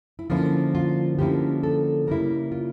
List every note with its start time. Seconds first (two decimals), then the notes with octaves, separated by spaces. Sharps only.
0.19 E4
0.30 D3 F3 A#3 C#4 E4 F4
0.75 F4
1.18 D3 F3 A#3 C#4 E4 G4
1.63 A4
2.07 C#3 G3 A#3 E4 A#4
2.52 F4